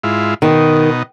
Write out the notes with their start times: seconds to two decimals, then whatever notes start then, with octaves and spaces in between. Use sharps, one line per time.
0.04 G#2 E4 F4
0.42 B2 D#3 D#4